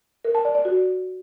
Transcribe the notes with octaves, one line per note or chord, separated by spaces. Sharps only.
A#4
A5
D5
D5
F#4